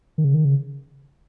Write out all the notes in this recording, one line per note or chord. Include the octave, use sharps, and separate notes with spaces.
D#3
C#3
D#3
C#3